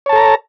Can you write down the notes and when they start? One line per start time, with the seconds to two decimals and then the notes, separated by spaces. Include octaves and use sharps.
0.06 C#5
0.09 A5
0.13 A4
0.16 A#5